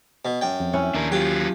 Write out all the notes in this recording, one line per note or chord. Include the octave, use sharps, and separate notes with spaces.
B2
F#2 G5
F2
C#4 E4 F#5
D#2 D4 A#4
F#3 F4 G4